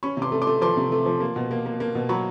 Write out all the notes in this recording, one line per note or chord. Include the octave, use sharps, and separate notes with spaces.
C#4 B5 C#6
C3 C6 D6
A3
C6 D6
A3
F3 C6 D6
C3
A3
F3
A#3
B2
A#3
A#3
A#3
B2
F#3 B5 C#6